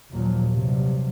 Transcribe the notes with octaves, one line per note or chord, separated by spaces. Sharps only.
D#2 A#2 F3 F#3
G2 C3 F3 F#3